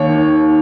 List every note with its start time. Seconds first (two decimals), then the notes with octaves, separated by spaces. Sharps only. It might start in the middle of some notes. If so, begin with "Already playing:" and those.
Already playing: D#2 C#5
0.09 D#3